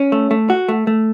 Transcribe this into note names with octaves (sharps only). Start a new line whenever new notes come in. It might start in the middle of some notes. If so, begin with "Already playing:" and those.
Already playing: C#4
A3
A3
F#4
A3
A3